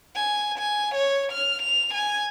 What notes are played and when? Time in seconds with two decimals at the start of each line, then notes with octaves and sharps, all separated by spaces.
0.16 G#5
0.58 G#5
0.95 C#5
1.32 F6
1.62 F7
1.94 G#5